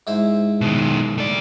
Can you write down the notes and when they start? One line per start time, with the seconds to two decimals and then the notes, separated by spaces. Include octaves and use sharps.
0.07 G#2 E4 C5
0.61 B2 D#3
1.18 A3 D5